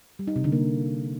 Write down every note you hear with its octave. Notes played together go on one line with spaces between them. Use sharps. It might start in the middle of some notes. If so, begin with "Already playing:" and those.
G3
D#4
C3
D3
A#3